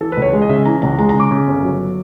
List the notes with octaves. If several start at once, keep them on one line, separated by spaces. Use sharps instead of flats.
E3 A4
B4
C#2
C#5
G#3
D#5
C#3 E5
E3 A#5
C#2 A#5
G#3 A#5
C#3 A#5
D6
C#3
G1
F#3